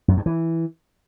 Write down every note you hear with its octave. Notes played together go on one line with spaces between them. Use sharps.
F#2
G2
E3